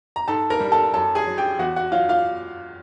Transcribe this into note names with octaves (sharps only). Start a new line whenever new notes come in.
A#5
G#2 A4 A5
A#4 A#5
G3
A4 A5
F#2 A4 A5
G#4 G#5
F#3
G4 G5
E2 F#4 F#5
F#4 F#5
F#3 F4 F5
F4 F5